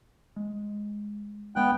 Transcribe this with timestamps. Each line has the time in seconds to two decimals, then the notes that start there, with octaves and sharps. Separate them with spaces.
0.36 G#3
1.56 D1 G#3 B3 C#4 G5 F#6